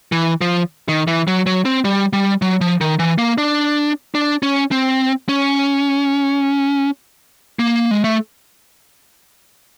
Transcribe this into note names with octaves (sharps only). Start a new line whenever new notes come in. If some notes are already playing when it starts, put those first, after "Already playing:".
E3
F3
D#3
E3
F#3
F#3
C4
G3
G3
F#3
F3
D#3
E3
A#3
D4
D4
C#4
C4
C#4
A#3
G#3
A3